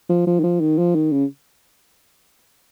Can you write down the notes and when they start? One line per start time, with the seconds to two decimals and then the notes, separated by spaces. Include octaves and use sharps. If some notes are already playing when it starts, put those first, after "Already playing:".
0.09 F3
0.27 F3
0.39 D#3
0.43 F3
0.60 D#3
0.78 F3
0.95 D#3
1.12 C#3